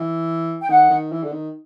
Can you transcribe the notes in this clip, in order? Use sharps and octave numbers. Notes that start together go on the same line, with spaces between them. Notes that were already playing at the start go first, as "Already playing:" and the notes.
Already playing: E3
G5
D#3 F#5
D#3
E3
D3
D#3